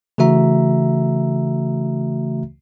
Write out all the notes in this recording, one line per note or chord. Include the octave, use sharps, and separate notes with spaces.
C#3 E3 A3 F#4 E5 A#5